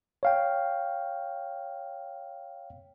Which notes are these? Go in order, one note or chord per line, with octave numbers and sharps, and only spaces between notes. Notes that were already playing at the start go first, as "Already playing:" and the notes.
C#5 F5 G5